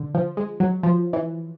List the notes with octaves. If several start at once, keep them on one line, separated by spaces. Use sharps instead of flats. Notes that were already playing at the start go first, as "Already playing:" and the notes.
Already playing: D3
F3
G#3
F#3
F3
E3